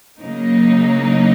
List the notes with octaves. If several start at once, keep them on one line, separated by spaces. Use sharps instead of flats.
C#3 F#3 A#3 D#4